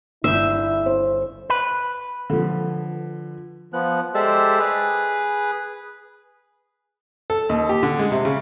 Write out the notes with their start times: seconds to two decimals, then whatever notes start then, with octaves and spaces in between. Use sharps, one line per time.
0.24 G1 E4 E5 G6
0.86 C5
1.50 B4
2.30 D3 F3
3.73 F3 B3 F#6
4.15 G#3 G4 A4 C5 D5 E5
4.59 G#4 B4
7.30 A4
7.49 D#2
7.69 G4
7.83 D3
7.99 G#3
8.12 C3
8.25 C#3